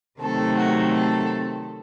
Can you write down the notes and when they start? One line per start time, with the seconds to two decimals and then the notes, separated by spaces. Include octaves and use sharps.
0.21 C3 D#3 F#3 A3 C4 A4
0.58 F#4
0.95 A4